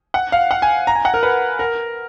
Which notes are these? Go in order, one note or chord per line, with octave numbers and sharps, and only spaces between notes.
F#5
F5
F#5
G#5
A#5
G#5
F#5
A#4
B4
A#4